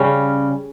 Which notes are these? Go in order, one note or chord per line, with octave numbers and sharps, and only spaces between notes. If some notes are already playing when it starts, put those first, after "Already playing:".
Already playing: C#3 G3 C#4